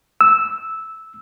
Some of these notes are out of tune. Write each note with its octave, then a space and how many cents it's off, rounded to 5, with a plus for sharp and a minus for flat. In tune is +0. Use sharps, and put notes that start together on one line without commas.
E6 -10